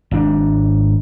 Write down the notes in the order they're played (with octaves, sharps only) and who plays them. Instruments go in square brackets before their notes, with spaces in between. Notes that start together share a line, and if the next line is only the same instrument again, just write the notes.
[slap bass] G#1 G#2 D4